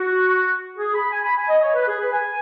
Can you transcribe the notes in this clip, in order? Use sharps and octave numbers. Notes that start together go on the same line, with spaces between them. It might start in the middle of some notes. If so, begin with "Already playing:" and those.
Already playing: F#4
G#4
B5
G#5
B5
G#5
D#5
C#5
B4
G#4
B4
G#5